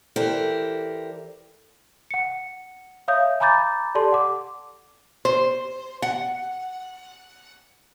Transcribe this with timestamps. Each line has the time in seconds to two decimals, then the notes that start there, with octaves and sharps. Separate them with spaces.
0.16 E3 G4 A4 A#4 C5 D5
2.11 F#5 C#7
3.08 C#5 E5 F5 D#6 G6
3.40 G#5 A#5 B5 D6 G6 A6
3.95 G4 A4 D5 A5 C6
4.12 F#5 D6
5.25 C5
6.02 F#5